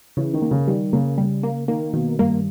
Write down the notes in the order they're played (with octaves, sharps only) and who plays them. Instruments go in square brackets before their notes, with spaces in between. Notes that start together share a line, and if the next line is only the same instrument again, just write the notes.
[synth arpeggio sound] C#3 [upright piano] E3
[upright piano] D#3
[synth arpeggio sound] A#3
[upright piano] C#3
[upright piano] D#3 [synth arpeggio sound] G3
[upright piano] C#3 [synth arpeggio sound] A#3
[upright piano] C#3 [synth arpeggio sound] G3
[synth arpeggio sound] A#3
[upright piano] D#3 [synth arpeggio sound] A#3
[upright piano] B2 [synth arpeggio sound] D#3
[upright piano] G2 [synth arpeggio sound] A#3